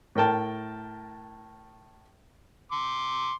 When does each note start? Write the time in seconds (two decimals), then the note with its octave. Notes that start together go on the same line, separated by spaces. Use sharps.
0.15 A2 A#4 G5 A5
2.71 C6 D6